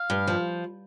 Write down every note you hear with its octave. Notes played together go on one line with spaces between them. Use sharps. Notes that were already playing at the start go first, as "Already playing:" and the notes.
Already playing: F5
G2
F3